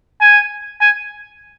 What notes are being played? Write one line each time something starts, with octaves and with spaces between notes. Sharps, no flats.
G#5
G#5